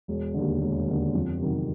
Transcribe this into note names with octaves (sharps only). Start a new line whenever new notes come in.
E1
D#2 D3
E1
D#2 D3
F2
C3 D#3 F#3